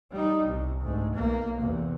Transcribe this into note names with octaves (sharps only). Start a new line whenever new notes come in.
G3 D#4
C2 C3
D2 G#2
B1 A#3
E2 C3